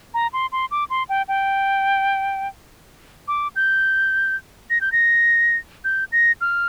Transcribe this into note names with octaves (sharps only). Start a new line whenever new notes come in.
A#5
C6
C6
D6
C6
G5
G5
D6
G6
A#6
G6
A#6
G6
A#6
F6